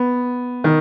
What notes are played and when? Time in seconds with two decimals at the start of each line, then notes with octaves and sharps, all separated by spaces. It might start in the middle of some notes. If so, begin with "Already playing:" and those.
Already playing: B3
0.64 D#3